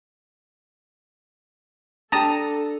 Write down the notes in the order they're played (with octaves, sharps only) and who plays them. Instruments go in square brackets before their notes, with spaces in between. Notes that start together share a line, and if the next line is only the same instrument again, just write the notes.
[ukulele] D4 G4 [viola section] A4 [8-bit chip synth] A5 A#5 D#6